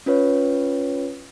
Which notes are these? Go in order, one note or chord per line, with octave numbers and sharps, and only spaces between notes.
C#4 F4 B4 C#5